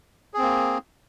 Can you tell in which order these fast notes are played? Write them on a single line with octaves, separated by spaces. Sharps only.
G#4 C4 A#3